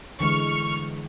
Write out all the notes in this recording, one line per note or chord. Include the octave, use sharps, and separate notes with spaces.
D3 E3 G#3 C#6 F6